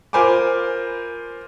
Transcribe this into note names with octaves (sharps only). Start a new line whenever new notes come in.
F4 A#4 C5 G#5 B5 D6